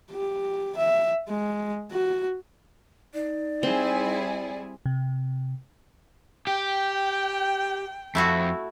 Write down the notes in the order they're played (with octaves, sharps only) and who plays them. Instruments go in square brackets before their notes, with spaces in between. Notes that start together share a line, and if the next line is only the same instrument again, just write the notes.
[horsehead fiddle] G4
E5
G#3
F#4
[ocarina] D#4 [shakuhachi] D5
[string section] G3 E4 G#4 [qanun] C4
[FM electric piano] C3
[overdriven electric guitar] G4 [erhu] G5
[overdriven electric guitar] F2 [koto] A3 E4 F#4